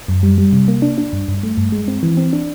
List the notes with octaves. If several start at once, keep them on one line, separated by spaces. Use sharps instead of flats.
F#2
G3
G3
C3
A#3
D4
D4
G2
G2
A3
G2
G#3
C4
E3
C4
D4